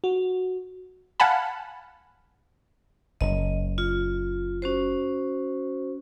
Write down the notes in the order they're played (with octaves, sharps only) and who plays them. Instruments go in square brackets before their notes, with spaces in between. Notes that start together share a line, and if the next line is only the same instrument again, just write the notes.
[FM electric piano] F#4
[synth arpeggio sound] F5 F#5 G#5 A5 B5
[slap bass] F#1 [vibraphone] D#5
[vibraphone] F4
C#4 F#4 C5